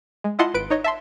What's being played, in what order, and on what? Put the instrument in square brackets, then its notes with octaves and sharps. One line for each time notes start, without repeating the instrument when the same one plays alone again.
[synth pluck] G#3
E4 F4 D#5 F#5 A5 C6
G#1 B4 D7
D#4 C#5 D#5
E5 A5 C6